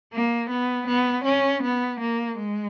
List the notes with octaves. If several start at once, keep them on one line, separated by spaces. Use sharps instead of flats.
A#3
B3
B3
C#4
B3
A#3
G#3